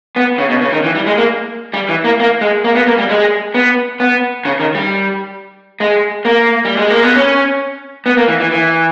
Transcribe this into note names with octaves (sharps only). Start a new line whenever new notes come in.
B3
C#3
B2
C#3
D#3
E3
G3
G#3
A#3
G3
E3
A#3
A#3
G#3
A#3
B3
A#3
G3
G#3
B3
B3
C#3
D#3
G3
G#3
A#3
G3
G#3
A#3
B3
C#4
B3
A#3
E3
E3
E3